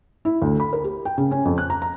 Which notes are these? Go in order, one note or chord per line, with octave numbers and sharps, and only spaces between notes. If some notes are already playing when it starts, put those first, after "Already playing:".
E4
D2
B5
A#4
G4
G5
C#3
C#4
F2
F#6
A#5
A#5